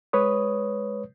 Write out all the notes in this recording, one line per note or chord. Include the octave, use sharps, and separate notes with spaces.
G#3 B4 C#5 D#6